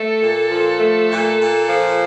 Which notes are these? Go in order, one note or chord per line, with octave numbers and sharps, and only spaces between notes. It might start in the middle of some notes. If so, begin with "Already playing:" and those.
Already playing: A3 A4
A#2
F3
A3
A#2
A#2
F3